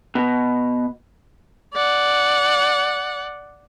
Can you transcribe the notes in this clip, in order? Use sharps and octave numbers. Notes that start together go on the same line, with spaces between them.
B2
D5 F#5